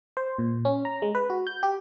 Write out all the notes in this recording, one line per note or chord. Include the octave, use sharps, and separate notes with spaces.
C5
A#2
C#4
A#5
G#3
B4
F#4
G6
G4